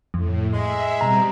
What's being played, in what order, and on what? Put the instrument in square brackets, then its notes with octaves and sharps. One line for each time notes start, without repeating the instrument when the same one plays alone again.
[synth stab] F2 [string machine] A2
[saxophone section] G#3 [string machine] E5
[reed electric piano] B2 A#5 [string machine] G3 C4